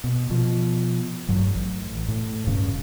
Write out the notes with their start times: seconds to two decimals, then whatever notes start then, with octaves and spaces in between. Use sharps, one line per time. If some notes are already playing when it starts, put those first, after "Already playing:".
0.04 B2
0.30 B2 F3
1.29 A1 G2 F#3
1.56 A1
2.08 A2
2.47 D#1 G2 C#3